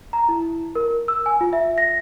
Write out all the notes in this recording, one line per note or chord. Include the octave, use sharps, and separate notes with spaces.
A#5
E4
A#4
E6
G#5
F4
E5
A#6